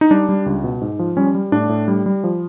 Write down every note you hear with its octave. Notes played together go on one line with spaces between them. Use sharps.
D#4
G3 D4
G3
C#2
B2
G#2
F3
G3 C#4
G3
A2 D4
A2
G3
G3
F3